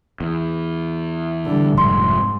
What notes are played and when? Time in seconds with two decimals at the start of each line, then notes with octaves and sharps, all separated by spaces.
0.21 E2
1.45 D3 G3
1.78 F1 G#2 C6